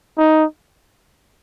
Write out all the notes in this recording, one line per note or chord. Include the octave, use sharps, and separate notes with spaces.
D#4